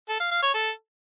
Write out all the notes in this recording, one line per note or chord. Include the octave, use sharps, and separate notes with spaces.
A4
F5
F5
C#5
A4